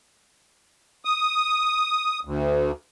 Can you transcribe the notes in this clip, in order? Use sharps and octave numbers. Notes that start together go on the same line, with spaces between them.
D#6
D2